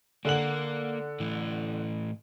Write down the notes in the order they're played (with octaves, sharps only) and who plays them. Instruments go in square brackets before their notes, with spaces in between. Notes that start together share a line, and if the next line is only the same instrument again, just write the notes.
[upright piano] D3 F#5 F#7 [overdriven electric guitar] A#3 A#4
[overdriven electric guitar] A2 E3